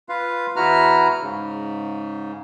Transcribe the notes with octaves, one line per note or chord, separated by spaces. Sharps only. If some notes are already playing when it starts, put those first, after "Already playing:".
F4 B4 F5
E2 E4 F#4 B4 A#5 F6
G#2 C#3